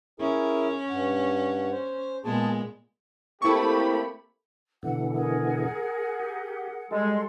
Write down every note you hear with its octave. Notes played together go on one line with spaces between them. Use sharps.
C#4 E4 G#4 A#4
G2 F#5
C5
A#2 G#3 B3 G#4 G#5 A5
A3 A#3 C4 E4 G4 B5 C#6
B2 D3 E3 F#5
G#4 A#4 F#5
G4
G3 G#3 A4 C6